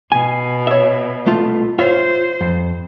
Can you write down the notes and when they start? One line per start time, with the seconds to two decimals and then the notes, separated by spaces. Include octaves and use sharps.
0.12 B2 G#5
0.67 C#5 E5
1.26 C2 A3 F4
1.79 F4 C5 C#5 E5
2.41 F2